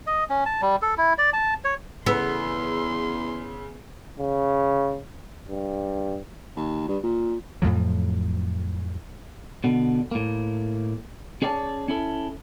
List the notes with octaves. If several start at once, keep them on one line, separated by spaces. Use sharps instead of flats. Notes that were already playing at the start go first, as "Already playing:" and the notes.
D#5
C#4
A5
G3
A4
E4
D5
A5
C#5
E2 C#3 B3 C6 E6
C#3
G2
D#2
G2
A#2
F2 A2 F3 F#3
B2 D3
A2 A#3
C#4 G#4 C#5 D5 G5 A5
C#4 E4 A4